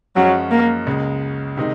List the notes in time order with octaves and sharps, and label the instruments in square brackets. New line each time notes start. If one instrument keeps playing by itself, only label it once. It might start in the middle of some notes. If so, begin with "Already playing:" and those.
[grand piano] F#2 F3 G#3 C#4 [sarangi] F#3
[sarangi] A#3
[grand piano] C#2 C#3 G#3
C3 D#3 G#3 D#4